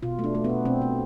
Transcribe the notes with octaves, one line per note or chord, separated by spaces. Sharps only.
B2 F4
A3 D4
A3
B3
B2
B2 C4
A3